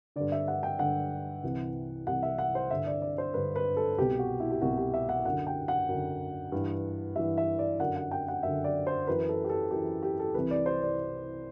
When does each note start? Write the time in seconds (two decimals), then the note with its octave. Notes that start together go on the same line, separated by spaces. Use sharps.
0.16 G2 D3 D5
0.32 E5
0.48 F#5
0.63 G5
0.79 G2 D3 F#5
1.43 C2 C3 E3
2.07 C2 C3 E3 F#5
2.23 E5
2.38 F#5
2.55 C5
2.70 G2 D3 E5
2.86 D5
3.02 D5
3.18 C5
3.34 G2 D3 B4
3.56 B4
3.77 A4
3.98 C2 B2 G4
4.19 F#4
4.40 E4
4.51 G4
4.61 C2 B2 F#4
4.77 G4
4.94 E5
5.09 F#5
5.25 F#2 D3 F#5
5.47 G5
5.68 F#5
5.89 F#2 D3
6.52 G2 E3
7.16 G2 E3 E5
7.38 E5
7.59 D5
7.80 F#2 D3 F#5
7.96 F#5
8.11 G5
8.28 F#5
8.43 F#2 D3 E5
8.64 D5
8.87 C5
9.07 F#2 E3 B4
9.29 A4
9.45 G4
9.49 A4
9.71 F#2 E3 G4
10.03 G4
10.19 A4
10.34 C2 C3 E3 B4
10.51 D5
10.66 C5
10.83 D5